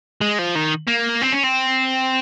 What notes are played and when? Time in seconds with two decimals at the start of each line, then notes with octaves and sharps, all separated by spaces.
0.21 G#3
0.39 F3
0.55 D#3
0.88 A#3
1.22 C4
1.32 C#4
1.44 C4